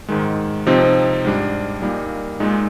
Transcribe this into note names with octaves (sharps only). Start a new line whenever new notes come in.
G#2 D#3 G#3
C3 F3 C4 D#4
G#2 G3 D4
A#2 G3 A#3 D#4
A#2 G#3 D#4